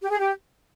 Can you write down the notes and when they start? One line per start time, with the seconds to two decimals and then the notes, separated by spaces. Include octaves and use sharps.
0.01 G4
0.10 G#4
0.19 G4